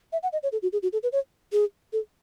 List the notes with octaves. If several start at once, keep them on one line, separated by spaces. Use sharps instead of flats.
E5
F#5
D#5
C#5
A4
F#4
G#4
F#4
A4
B4
C#5
G#4
A4